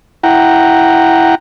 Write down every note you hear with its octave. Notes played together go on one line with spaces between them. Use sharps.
E4 F#5 G5 A#5